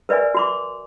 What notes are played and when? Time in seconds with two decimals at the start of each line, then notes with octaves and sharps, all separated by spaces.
0.09 A#4 B4 D5 E5 G#5
0.34 F#4 C6 D6